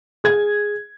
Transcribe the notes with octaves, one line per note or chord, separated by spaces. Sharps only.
G#4 G#6